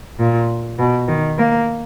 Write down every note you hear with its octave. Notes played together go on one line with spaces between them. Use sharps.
A#2
B2
D#3
A#3